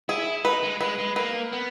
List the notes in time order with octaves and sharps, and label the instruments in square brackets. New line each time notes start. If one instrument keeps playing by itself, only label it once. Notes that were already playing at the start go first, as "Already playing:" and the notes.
[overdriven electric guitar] E4 [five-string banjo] G#4
[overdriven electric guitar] D#4 [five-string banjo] B4
[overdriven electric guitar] G#3
[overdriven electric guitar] G#3 [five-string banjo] B4
[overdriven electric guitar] G#3
[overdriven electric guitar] A#3 [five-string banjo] B4
[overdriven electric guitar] B3